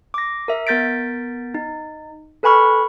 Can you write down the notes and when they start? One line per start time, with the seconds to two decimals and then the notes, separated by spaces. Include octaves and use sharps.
0.14 D6 A#6
0.48 A#4 E5
0.67 B3 A#4 G6 A6 B6 D7
1.54 D#4
2.43 A4 B4 G#5 B5 C#6 F6